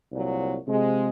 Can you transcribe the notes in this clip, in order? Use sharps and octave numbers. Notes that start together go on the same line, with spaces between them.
C2 A#2 F#3
C3 F3 G#3